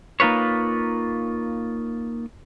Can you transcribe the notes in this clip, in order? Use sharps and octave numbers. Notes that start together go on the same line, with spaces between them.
A#3 D#4 F4 B4 C#5